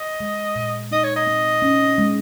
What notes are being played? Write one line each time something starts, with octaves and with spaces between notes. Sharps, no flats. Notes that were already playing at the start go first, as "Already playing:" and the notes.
Already playing: D#5
G#3
A#2
D#4 D#5
C#5
D#5
C4
C#4
G#3